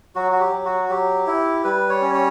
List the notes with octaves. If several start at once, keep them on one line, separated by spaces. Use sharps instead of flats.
F#3 F#4
F#4
G4
F#3
F#4
F#3 G4
E4
G3 B4
C#5
C#4
C#5